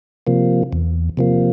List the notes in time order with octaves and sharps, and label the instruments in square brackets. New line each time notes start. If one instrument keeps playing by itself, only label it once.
[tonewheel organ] C3 F3 A#3
E2
C3 F3 A#3